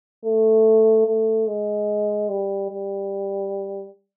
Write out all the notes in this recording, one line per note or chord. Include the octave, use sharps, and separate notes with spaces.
A3
A3
G#3
G3
G3